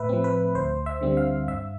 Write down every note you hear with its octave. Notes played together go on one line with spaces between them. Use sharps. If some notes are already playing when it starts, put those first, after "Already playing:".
Already playing: A2 B4 E5
F3 C4
B4
D2 C5
E5
D3 G3 C4
F5
G2 E5